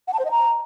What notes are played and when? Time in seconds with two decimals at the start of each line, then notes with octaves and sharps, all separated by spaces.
0.07 F#5
0.13 A5
0.19 C5
0.25 D#5
0.31 A#5